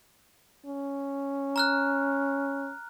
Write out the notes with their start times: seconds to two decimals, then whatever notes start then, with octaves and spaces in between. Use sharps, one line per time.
0.66 C#4
1.56 A#5 F6 F#6